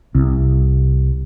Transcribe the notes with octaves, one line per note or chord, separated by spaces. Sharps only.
C2